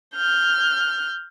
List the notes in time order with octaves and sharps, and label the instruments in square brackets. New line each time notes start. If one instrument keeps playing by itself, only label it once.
[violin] F6 G6